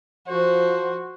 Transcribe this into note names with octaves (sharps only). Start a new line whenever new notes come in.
F3 F#4 C5